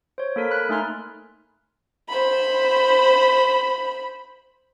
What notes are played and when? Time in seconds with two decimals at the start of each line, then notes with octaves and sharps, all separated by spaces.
0.18 C5 C#5
0.36 A#3 A4 A#4 B6
0.51 B5 F#6
0.69 A3 D#4 G#5 C6 F6
2.09 C5 B5